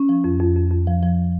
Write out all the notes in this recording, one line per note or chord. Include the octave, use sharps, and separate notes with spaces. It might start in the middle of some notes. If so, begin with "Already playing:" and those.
Already playing: C#4
F3
F2
F2
F2
F2
F3
F3